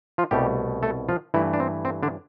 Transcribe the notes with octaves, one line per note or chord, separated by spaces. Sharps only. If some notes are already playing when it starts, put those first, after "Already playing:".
F3 F4
C2 B2 G3 A3 G4
A3 A4
F3 F4
G2 E3 A3 E4
D4
C4
C4
D3 D4